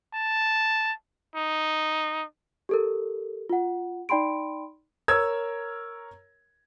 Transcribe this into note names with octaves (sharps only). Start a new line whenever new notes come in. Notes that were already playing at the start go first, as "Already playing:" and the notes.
A5
D#4
G4 A4 A#4
F4 F#5
D#4 D5 G5 B5 C6 D7
A#4 C#5 E6 G#6